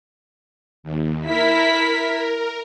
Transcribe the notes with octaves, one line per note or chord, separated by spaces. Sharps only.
D#2
E4 A#4 B6